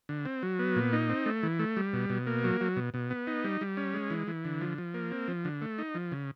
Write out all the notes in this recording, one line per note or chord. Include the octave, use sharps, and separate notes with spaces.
D3
C4
F#3
B3
A#2
D#4
C4
A3
E3
A3
G3
B2
B2
A#3
F#3
F#3
B2
B2
B3
D#4
G3
G3
C#4
G#3
E3
E3
D3
F3
F3
A#3
C4
F3
D3
A3
D#4
F3
C#3